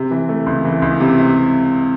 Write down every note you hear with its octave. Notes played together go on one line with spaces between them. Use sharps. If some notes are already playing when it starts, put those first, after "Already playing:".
Already playing: C3
E3
A3
C#2
E3
C#2
C3
C3